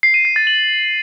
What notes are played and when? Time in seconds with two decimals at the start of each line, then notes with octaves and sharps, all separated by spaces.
0.03 C7
0.14 D#7
0.25 C7
0.36 A6
0.47 F#7